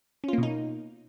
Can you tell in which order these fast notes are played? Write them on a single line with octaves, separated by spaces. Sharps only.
C#4 F4 A#3 B2 D#4